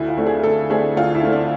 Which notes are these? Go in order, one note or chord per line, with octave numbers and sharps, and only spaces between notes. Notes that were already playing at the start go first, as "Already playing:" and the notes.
Already playing: D2 E4
F4
D3 A3 C4
G#4
D2 A4
D3 A3 C4 G#4
D2 F4
E4
D3 A3 C4
D4